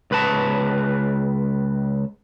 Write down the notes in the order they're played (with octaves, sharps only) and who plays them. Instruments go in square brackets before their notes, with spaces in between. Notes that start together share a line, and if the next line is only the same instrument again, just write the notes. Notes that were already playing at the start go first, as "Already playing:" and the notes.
[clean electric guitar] C#2 B4 A5